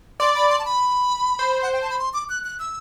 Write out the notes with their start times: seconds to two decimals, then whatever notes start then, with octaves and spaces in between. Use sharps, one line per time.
0.20 D5 C6
0.35 B5
0.50 C6
0.59 A5
0.65 B5
1.39 C5
1.62 F#5
1.73 G5
1.82 A5
1.90 B5
1.99 C6
2.14 D6
2.29 F#6
2.44 F#6
2.59 E6